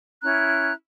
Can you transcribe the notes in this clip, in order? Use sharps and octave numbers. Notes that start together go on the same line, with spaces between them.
C#4 E4 A#5 F#6